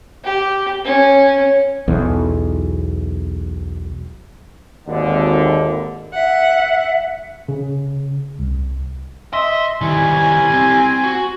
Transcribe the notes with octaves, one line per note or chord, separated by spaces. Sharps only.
G4
C#4
B1 E2
G#1 D#2 D3
E5 F#5
C#3
C2
D#5 E5 C6
D#3 G3 B3 E4 G#5
C4
F#4